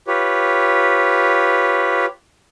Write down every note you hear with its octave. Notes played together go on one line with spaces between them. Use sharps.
F4 G4 B4 C#5